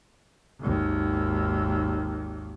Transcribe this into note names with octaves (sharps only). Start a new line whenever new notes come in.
G#1 D#2